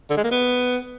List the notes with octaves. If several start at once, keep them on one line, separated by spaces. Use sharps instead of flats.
D3
G#3
A#3
B3